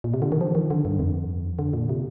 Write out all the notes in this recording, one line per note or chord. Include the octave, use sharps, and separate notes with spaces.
A#2
C3
D3
D#3
F3
D#3
D3
G2
F2
D3
A#2
C3